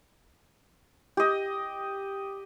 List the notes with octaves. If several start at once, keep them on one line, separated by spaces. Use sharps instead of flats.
G4 D#5